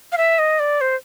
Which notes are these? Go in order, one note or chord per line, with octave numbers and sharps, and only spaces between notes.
F5
E5
D#5
D5
C5